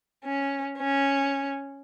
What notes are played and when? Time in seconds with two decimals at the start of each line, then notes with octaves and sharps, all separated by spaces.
0.24 C#4
0.78 C#4